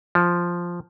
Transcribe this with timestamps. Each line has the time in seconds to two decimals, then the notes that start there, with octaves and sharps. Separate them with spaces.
0.15 F3